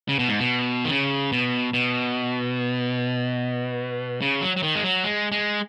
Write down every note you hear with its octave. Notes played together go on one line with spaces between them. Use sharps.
C#3
B2
G#2
B2
D#3
C#3
B2
B2
C#3
F#3
F#3
D#3
G#3
F#3
G#3
G#3